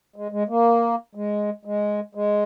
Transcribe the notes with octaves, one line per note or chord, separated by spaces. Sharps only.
G#3
G#3
A#3
G#3
G#3
G#3